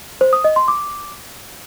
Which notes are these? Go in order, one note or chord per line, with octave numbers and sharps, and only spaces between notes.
C5
D#6
D#5
C6
D6